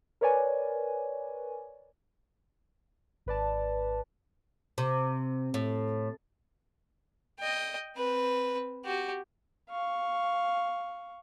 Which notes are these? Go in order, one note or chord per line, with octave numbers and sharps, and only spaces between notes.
A#4 B4 C#5 D5 G#5
G#1 B4 D5 A5
C3
A2
D#5 G5
C4 B4
F#4 G4
F5 C#6